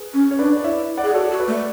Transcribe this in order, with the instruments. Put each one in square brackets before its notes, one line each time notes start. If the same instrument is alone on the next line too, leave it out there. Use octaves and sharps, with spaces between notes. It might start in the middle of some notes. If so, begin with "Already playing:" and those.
Already playing: [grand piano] G#4 B4
[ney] C#4
[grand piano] C#5
[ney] D4 [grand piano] B4 D5
[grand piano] D5
[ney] E4 [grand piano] C#5 E5
[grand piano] D5 F#5
[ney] G#4
[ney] F#4 [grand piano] A4 C#5
[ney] F#4
[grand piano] B4 D5
[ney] A3